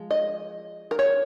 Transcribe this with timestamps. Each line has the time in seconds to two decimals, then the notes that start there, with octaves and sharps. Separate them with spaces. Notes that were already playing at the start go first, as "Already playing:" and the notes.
Already playing: F3 G#3
0.11 D#5
0.91 A#4
0.99 C#5